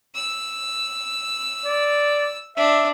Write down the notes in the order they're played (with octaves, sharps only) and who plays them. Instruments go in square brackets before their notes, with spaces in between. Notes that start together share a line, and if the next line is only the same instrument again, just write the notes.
[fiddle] E6
[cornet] D5
[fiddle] D4 [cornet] E5